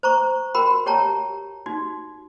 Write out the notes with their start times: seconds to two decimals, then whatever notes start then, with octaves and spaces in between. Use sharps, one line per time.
0.03 C5 A#5 C#6
0.55 F#4 A#4 G5 B5
0.86 G4 C#5 G5 A5 A#5
1.66 D#4 F#4